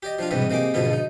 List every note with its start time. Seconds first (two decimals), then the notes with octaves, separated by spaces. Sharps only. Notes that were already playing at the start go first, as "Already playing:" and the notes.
0.03 G4 D5 D#5
0.19 F3 D4 F4
0.31 B1 E2 G#2 C3 G3 B3
0.50 C3 A#3 D#4 G#4 D6
0.74 C#2 G#2 B2 D3 F3 B3
0.93 D#4